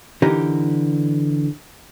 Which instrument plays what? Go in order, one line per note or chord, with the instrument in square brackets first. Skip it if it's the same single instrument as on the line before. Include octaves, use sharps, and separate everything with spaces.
[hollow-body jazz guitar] D3 E3 D#4 G4 A#4